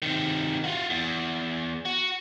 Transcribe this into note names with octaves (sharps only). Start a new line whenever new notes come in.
C3 D#3
F4 F#4
E2
F#4